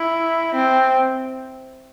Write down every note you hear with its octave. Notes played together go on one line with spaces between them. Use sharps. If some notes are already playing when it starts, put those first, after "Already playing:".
Already playing: E4
C4